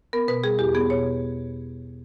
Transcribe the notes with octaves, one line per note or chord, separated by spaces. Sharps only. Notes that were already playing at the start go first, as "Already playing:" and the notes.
B3 A#4
B2 B4
G3 G#4
E2 G4
B3 G#4
B2 C#5